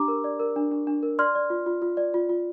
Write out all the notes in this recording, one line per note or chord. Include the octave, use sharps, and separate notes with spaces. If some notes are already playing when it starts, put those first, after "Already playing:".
Already playing: D4 G4 A#5 D6
A#4
D5
A#4
D4
D4
D4
A#4
D5 C6 F6
D5
F4
F4
F4
D5
F4
F4